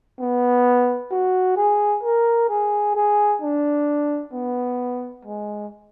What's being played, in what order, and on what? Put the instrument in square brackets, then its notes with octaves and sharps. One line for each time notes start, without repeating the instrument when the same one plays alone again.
[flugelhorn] B3
F#4
G#4
A#4
G#4
G#4
D4
B3
G#3